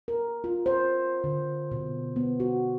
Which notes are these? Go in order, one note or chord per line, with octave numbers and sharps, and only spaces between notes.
A#4
F4
C5
D3
B2
B3
F#4